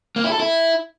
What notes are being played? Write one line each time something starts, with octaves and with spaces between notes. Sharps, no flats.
A#3
E4
A4
E4